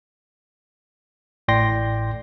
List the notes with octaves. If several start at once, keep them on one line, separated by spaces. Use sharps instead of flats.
A1 A2 D5 G5 C6 A#6